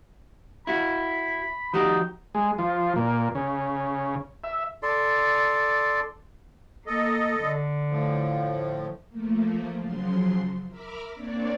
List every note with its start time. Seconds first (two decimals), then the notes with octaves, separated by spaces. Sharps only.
0.67 E4 F#4 B5
1.74 F3 D#4 F#4 G4
2.35 G#3
2.58 F3
2.96 A#2
3.35 C#3
4.44 E5
4.83 A4 D5 C6
6.87 A#3 A4 D#5
7.40 D3
7.90 A2 F3
9.09 F3 A3 A#3
9.80 C#3 F3 F#3 C6
10.68 A#4 E5 B5 D6 F6
11.14 A#3 C4 D4 C#5 D5